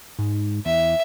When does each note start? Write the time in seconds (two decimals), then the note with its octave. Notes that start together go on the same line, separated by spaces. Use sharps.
0.19 G#2
0.66 E2 E5